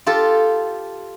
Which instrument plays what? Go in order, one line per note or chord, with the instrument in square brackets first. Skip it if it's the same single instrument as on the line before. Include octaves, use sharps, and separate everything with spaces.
[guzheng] F4 G4 A4